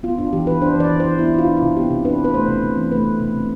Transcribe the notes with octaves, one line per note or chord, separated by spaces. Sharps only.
B3 F4
D4 F4
E3 G4
E3 B4
D4 C5
E3 D5
E3
E3 C5
B3 E4
D4 F4
D4
F4
C3
B3 G4
C3
D4 B4
B3
B4
A3 C5
C3
C3
E3
A3 B4
C3
C3
C3